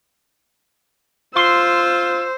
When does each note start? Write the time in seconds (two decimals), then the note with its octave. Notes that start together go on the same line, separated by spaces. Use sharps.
1.36 F4 C5 C6 E6